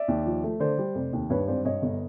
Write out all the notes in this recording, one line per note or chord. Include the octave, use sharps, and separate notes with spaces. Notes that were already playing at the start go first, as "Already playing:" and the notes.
Already playing: D5 E5
D#2
F3
A3
D3 C5 D5
G3
F1
D#2
G2 B4 C#5
G#1 C5 D5
G2 C#5 D#5
G1